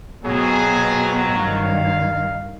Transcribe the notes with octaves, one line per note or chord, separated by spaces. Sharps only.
F2 B2 F#3 G#4
G2 D#3 F5